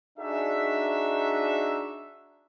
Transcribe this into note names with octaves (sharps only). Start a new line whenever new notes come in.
D4 D#4 F#4 G#4 E5